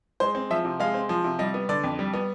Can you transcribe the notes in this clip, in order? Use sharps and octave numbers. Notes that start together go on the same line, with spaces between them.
G#3 C5
C4
F3 E5
C3
G#3 F5
C4
F3
C3
G3 D#5
B3
D3 D5
F2
G3
B3